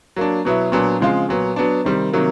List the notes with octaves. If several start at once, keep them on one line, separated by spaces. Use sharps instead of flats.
F#3 A#3 D4
B2 F#3 B3 E4
A#2 F#3 B3 D4
C#3 F3 G#3 C4 F4
A#2 F#3 B3
F#3 B3 D4
C3 D#3 G3 C4
C3 D#3 F#3 A#3